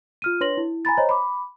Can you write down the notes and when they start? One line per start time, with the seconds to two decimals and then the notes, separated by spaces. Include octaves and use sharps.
0.22 F4 F6 D#7
0.40 D4 B4 C#5 C6 A#6 F#7
0.57 E4
0.85 G#5 A#5 B5 A6
0.97 C5 C#5 D#5 A#5
1.09 B5 D6